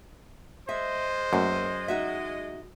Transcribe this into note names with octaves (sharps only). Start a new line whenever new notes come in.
G#3 C5 D#5 E5
F#2 A3 A#3 B4
D#4 F#4 E5